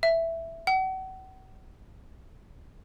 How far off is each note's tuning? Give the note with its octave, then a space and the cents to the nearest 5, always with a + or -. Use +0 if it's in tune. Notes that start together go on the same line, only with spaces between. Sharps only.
E5 +5
F#5 +35